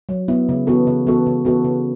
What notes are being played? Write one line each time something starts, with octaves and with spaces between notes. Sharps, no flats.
F#3
B3 E4
C#3
E3 B3 F#4 A4
C#3
E3 B3 F#4 A4
C#3
E3 B3 F#4 A4
C#3